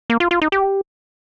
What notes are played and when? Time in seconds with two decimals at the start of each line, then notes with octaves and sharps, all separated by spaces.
0.10 A#3
0.20 F4
0.31 F4
0.42 D#4
0.52 G4